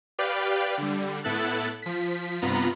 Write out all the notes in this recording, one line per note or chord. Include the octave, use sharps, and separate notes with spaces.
G4 B4 D5 F5 G5
D3 G3
A2 B3 E4 A4 F#6 A6
F3 B6
G2 C3 B3 F4 A#5 B5